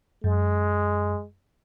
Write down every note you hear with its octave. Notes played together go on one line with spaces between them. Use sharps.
F#2 G#3